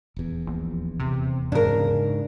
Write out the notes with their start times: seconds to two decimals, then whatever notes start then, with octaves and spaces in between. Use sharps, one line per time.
0.17 D#1 E2
0.47 A#1
1.00 C3
1.52 G#2 C#3 D4 A#4